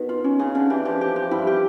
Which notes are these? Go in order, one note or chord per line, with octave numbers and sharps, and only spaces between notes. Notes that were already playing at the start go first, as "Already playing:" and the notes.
Already playing: B2 D#3
F4
C#4
C#3 G#4
D3 C#4
E3 G4
F3 G4
G4
G4
G2 G3 E4
G4